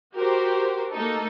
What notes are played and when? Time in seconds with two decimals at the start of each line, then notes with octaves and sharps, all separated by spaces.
0.16 F#4 G4 A#4 C5
0.93 A3 A#3 D#4 A4